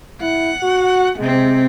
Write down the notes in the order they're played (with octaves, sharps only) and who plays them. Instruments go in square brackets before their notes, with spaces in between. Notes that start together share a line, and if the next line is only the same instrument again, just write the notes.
[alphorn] E4 [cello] F#5
[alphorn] F#4
[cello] C3 C4 [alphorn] G#3